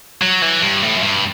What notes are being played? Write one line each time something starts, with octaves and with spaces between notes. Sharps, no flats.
F#3
E3
G2
A2
F#2
G2